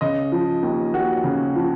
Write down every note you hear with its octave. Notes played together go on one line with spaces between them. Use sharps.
C#3 D#5
F3
D#2
D#2 F#4
C#3
F3